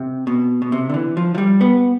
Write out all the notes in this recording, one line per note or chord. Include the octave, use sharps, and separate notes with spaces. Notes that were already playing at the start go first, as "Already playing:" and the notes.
Already playing: C3
B2
B2
C3
D3
E3
F3
F3
G3
B3